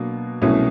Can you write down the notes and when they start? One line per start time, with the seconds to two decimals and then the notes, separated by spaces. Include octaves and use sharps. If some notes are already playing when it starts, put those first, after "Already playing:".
Already playing: B2 F#3 A#3 D4
0.42 C2 B2 F#3 A3 C#4